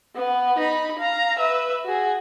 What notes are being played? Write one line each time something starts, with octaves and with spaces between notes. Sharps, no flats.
B3
D#4 B5
F5 A#5
B4 E5
F#4 G#4